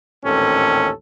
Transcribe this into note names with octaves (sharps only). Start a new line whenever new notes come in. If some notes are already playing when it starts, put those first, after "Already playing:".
A1 D#2 A#2 C4 C#4 A4